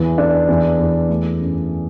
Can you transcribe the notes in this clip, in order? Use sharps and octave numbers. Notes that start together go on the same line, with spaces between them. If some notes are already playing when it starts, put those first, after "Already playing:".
Already playing: E2 E3
D4
E2
E2
A3
F#2